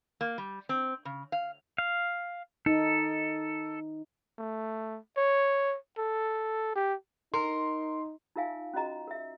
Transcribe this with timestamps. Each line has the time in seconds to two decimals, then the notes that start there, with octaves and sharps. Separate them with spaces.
0.21 A#3
0.38 G3
0.69 C4
1.05 C#3
1.32 F5
1.78 F5
2.66 D#4 A4
4.38 A3
5.17 C#5
5.98 A4
6.75 G4
7.34 D#4 A#4 C6
8.36 D#4 F4 A#4 E5 F5 G#5
8.73 C#4 F4 F#4 D#5 A#5
9.08 A#4 E5